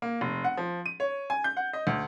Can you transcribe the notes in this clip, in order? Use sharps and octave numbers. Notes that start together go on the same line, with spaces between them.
A#3
F1
F#5
F3
D#7
C#5
G#5
G6
F#5
D#5
D2